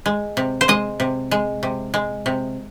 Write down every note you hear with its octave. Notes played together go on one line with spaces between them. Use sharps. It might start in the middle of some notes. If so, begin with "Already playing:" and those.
G#3
C3
C5
G#3 D#5
C3
G#3
C3
G#3
C3